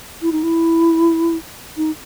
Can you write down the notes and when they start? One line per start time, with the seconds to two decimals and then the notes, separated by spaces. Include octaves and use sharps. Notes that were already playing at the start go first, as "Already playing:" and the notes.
0.22 E4
0.32 D#4
0.43 E4
1.77 D#4